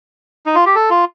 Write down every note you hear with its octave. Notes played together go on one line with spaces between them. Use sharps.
D#4
F4
G4
A4
F4